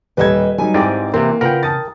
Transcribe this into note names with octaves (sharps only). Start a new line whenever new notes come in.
D#1 G3 B4 D#5 E5 G#6
F#3 G3 D#4 G#5
G#2 C4 E4 G4 D5 D6
C3 E3 A#3 C4
C#3 F4 A#4 B4 F#5 G5
A5 D#6 A6